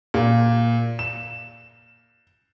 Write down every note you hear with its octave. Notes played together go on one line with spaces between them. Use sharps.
A#2
E7